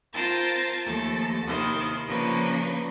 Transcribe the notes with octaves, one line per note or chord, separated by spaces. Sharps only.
C4 F4 A#4 C5 A5 A6
D#2 F3 A3 A4 A6
D#2 C3 D#3 E4 C6
C#3 F3 A#3 D4 D#4 B4